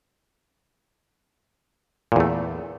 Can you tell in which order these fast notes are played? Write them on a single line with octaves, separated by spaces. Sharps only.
A#2 E2 A3